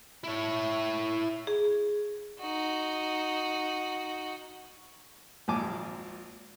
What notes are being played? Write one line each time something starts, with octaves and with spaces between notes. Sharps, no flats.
E4 C#5
G#4
D#4 F#4
G#1 F2 A#2 G#5 A5 D6